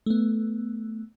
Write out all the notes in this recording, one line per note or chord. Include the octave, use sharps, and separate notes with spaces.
A3 B3